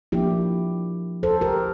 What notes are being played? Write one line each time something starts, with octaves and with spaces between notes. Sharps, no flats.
F3 A#3 D4 E4 G4
A4 C5
G4 A#4